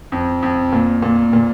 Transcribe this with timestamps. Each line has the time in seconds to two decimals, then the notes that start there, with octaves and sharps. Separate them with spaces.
0.12 F2
0.42 F2
0.72 A#2
1.02 A#2
1.33 A#2